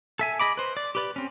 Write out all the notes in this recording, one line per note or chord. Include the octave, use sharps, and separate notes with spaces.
A4 E5 G#5
G#4 D#5 B5 D6
B4 C5
D5
G4 B4 D5
C4 C#4